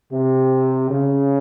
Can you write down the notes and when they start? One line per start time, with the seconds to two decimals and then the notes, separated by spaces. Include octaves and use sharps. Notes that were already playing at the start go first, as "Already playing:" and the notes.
0.13 C3
0.91 C#3